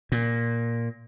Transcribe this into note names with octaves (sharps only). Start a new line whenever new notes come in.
A#2